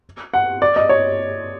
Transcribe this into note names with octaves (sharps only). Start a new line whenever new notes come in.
F#5
D5
D#5
C#5